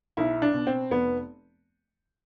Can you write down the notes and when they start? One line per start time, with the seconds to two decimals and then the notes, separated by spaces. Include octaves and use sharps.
0.17 B1 E4
0.42 D4
0.54 B2
0.67 C4
0.90 F1 B3